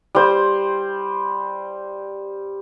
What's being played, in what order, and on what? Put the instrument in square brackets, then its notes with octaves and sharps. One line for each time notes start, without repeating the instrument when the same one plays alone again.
[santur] G3 C5